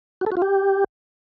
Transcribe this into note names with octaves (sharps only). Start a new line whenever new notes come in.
F#4
A4
F#4
F4
G4